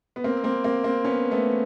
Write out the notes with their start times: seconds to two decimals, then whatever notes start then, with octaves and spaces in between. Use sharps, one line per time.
0.16 B3
0.24 A#3 C4
0.44 A#3 C4
0.64 A#3 C4
0.84 A#3 C4
1.04 B3 C#4
1.31 A3 B3